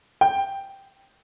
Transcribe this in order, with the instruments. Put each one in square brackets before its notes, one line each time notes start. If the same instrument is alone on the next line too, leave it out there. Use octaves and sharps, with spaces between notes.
[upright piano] G5